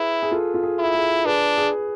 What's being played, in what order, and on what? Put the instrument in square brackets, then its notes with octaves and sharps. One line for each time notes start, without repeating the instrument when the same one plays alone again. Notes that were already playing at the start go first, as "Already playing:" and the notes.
Already playing: [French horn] E4 [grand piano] G#4 B4
[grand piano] G#4
F4 A4
F4
G#4
[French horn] E4
[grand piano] G#4
[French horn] D4 [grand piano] G#4 B4
[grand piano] G#4